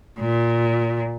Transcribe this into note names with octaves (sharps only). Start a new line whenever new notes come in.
A#2